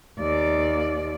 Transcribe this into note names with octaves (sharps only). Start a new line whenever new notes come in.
D#2 D5